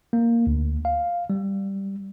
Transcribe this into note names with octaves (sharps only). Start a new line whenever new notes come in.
A#3
D2
F5
G3